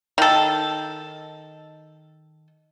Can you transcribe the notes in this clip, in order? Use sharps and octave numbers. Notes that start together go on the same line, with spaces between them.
D#3 A4